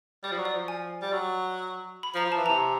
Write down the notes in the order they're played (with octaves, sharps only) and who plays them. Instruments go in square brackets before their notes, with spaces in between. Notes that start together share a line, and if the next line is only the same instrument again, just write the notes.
[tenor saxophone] G3 [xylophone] D5
[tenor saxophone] F3
F#3
[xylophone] D5
[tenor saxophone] F3
[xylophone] G#5
[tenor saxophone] G3
F#3
[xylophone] B5
[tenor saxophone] F3 [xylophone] A#5
[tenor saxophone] F3
[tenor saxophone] E3 [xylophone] A5
[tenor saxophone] C3 [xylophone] A#5